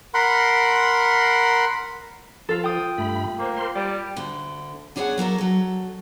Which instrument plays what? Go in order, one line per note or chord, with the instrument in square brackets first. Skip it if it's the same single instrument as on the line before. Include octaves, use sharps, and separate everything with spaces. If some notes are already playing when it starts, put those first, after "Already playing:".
[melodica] A#4 F#5 B5 C6
[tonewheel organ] F3 [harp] F4 A4
[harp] G5 D#6
[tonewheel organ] G2 A3 B5
[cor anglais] A#3 [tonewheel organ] C5
[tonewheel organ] A#4 C5 C6
[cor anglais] G3 [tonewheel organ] D5
[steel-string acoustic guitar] D2 D3
B3 D4 G#4 C#5 D#5 F#5
F#3 A#3 A4 A#4
F#3 A4